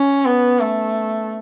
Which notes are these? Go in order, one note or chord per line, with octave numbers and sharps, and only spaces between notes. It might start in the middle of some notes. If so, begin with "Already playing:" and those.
Already playing: C#4
B3
A3